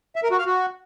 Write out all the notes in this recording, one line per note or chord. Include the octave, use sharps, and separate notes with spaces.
E5
A#4
F#4
F5
F#4